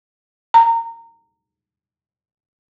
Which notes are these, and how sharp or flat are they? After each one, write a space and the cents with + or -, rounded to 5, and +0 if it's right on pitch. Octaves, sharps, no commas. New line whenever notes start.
A#5 -20